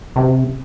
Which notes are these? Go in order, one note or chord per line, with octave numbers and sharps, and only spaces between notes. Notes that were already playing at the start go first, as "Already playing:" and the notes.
C3